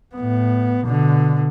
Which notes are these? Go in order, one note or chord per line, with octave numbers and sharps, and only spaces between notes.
A2 B3
B2 D3